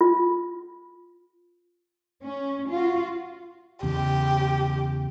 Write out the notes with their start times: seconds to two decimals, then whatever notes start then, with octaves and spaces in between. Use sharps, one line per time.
0.01 F4
2.22 C#4
2.70 F4 F#4
3.83 E2 C#3 G4